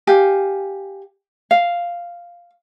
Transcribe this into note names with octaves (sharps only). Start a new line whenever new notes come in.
G4 F5 G#5
F5